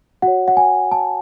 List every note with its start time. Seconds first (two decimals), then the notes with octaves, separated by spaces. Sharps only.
0.22 F#4 F#5
0.28 C#5
0.48 F#5
0.57 G#5
0.91 A5